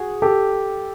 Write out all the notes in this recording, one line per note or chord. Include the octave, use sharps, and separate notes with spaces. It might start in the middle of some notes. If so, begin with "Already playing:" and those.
Already playing: F#4 G#4
G4 A4